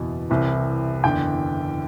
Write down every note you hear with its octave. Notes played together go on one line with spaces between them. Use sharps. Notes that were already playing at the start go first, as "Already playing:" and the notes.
Already playing: F#1 E2 B2
C2 C3 E3
F#1 E2 D3 G5